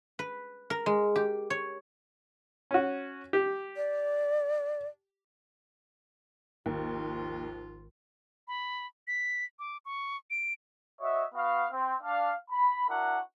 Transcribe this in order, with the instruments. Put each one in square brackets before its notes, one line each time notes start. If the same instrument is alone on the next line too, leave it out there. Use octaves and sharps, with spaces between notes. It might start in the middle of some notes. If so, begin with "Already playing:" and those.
[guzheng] B4
A#4
G#3
G4
C#5
[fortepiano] C#4 F#4
G4
[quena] D5
[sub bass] G#1 [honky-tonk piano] D#2 [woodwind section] G#2 F3 F4
[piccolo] B5
B6
D6
C#6
D7
[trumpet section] F#4 C#5 D#5 E5
B3 F#4 F5
C4
D4 F5
B5
D4 E4 F#4 A#4 F#5